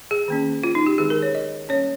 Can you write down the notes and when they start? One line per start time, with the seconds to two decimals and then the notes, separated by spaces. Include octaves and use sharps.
0.11 G#4
0.28 D#3 A#3 C#4
0.64 F4
0.75 D#4
0.86 G4
0.98 D#3 G#3 C4 G#4
1.10 A#4
1.22 C#5
1.35 D#5
1.69 G3 A#3 C#4 C#5